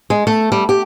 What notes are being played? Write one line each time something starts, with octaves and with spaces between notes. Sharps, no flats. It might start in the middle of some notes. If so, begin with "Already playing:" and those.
G#3
A3
G3
G4